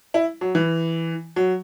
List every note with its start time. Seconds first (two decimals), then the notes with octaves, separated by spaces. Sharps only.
0.14 E4
0.41 F#3
0.55 E3
1.36 F#3